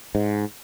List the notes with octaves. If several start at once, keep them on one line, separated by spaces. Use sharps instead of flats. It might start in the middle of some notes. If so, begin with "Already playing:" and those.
G#2